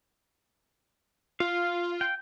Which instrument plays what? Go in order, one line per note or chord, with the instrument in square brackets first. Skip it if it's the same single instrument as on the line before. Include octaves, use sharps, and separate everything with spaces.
[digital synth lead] F4 [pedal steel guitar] F5
[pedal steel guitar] G5